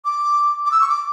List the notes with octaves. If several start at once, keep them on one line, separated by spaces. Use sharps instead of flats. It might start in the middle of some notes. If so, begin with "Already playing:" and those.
D6
D6
E6
C#6
D6